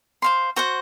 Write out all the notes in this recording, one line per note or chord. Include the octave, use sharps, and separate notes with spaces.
C5 F5 C6
F#4 C5 F#5